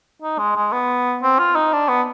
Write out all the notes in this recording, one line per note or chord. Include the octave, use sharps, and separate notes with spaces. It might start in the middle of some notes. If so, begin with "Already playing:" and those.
D#4
G#3
G#3
B3
C4
F4
D#4
D4
B3